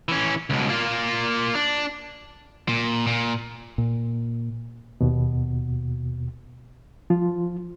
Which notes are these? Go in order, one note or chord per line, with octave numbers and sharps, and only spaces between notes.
E3 C#4
C#2 B2
A#3 F4
D4
A#2
A#2
A#2
D#2 B2
F3 F4